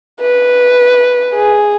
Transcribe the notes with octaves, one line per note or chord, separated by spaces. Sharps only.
B4
G#4